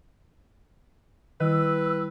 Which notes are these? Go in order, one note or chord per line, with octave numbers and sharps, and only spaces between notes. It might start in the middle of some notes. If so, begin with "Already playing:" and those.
D#3 G3 E4 B4 E6